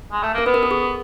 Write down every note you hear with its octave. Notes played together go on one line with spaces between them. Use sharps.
G#3
A3
A#3
A#4
B3 B4
A#4
A4
G#4